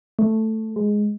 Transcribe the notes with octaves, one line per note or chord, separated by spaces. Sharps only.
A3
G#3